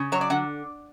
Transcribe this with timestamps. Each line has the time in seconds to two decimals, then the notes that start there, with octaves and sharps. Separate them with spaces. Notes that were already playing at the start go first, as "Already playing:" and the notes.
Already playing: C#3
0.12 F#3 C#5
0.21 D5
0.30 D3 F#5